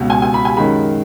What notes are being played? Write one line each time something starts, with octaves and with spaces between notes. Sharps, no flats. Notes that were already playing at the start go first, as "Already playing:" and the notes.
Already playing: C#2 B2 B3
G#5
G#5
B5
G#5
F#2 D#3 G#3 B5